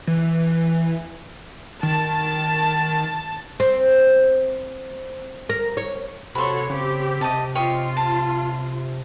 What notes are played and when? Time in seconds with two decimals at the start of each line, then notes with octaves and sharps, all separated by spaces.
0.07 E3
1.83 D#3 A5
3.60 C4
5.50 A#4
5.77 C#5
6.35 C3 F#4 A4 C#5 B5 C6
6.70 C#3 C4 G4
7.21 C3 D#5 A5
7.55 F4 G4 C#5 D#5
7.97 A5